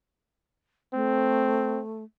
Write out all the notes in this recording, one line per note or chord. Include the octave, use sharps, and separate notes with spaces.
A3 C4